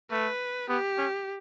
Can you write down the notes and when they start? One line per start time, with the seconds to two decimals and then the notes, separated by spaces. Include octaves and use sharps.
0.11 A3 B4
0.69 B3 G4
0.98 C#4